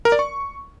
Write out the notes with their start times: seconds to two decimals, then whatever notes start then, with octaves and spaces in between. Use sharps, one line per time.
0.05 A#4
0.12 D5
0.19 C#6